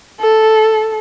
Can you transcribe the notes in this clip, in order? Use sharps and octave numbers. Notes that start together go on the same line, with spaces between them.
A4